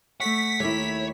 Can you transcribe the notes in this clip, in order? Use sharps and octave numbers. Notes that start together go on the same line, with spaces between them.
A3 A4 C#5 F#5 B6
D#2 A3 E4 A#4 C#5